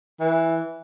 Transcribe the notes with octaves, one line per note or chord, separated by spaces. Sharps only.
E3